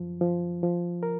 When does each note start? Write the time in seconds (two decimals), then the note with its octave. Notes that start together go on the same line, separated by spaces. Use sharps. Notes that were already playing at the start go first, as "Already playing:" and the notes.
Already playing: F#2 F3
0.21 F3
0.63 F3
1.03 A#4